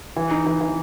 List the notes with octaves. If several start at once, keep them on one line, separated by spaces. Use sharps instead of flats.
E3
D#4
E3
E3